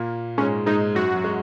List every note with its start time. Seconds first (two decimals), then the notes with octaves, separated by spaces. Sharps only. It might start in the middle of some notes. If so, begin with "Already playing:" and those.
Already playing: A#2 A#3
0.38 G#2 G#3 C#4
0.66 G#2 G#3 D#4
0.95 F#2 F#3 F#4
1.13 F#3
1.24 G#3